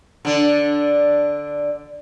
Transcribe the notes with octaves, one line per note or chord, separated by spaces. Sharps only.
D3 D4